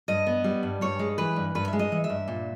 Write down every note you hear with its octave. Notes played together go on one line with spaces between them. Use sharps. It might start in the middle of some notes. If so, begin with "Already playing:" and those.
G2 D#5
B3
G3
G2
G2 C#5
G#3
E3 B4
G2
G2 B4
E5
G#3
D#5
E3
E5
G2
A#2